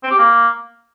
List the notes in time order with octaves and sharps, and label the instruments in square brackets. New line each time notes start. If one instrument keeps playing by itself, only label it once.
[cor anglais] C4
G4
A#3